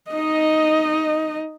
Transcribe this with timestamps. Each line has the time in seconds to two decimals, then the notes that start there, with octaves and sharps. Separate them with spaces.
0.11 D#4 D#5